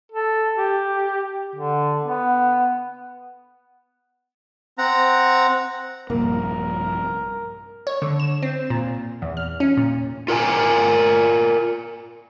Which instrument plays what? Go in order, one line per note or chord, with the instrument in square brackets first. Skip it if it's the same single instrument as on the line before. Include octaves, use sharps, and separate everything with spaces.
[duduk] A4
G4
D3
B3
[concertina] C4 F#5 A#5
[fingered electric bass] A#1 G2 C3 [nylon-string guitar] A#3 [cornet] A#4
[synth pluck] C#5
D3
E7
C4
A#2
E2
F6
C#4
A#2
[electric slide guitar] F4 A#4 G5 G#5